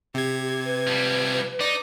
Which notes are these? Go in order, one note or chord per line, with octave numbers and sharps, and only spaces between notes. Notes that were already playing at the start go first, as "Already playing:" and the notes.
C3 G4 G#6
B4
F3 G3
D#4 D5